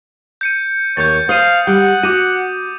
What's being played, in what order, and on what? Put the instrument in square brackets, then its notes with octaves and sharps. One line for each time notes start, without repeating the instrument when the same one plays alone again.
[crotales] G6 C#7 D#7
[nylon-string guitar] D#2 [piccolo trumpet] C#5 [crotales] G6 A6
[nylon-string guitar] C5 [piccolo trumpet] F5 [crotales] D#6 D#7
[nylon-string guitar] G3 [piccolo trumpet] F#5
[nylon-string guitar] F#4 [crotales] D6 D#7